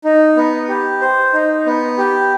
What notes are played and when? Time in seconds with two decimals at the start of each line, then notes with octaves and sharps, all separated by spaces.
0.04 D#4
0.37 B3
0.68 G4
1.01 C5
1.33 D#4
1.66 B3
1.98 G4